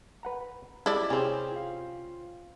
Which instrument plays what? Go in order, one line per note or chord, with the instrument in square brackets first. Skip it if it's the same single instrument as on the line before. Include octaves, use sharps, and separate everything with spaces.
[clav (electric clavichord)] B4 F#5 A#5
[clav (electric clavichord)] G#3 [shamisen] E4 D5 [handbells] G4
[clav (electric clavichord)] C3 [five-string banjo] C4 C#4 [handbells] G#4
[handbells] F4 F5